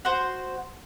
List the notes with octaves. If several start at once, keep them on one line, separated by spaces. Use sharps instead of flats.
F#4 C5